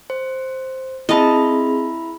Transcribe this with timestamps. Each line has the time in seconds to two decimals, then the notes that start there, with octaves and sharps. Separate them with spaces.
0.10 C5
1.09 C4 E4 G#4 D#5 E5 A5 B5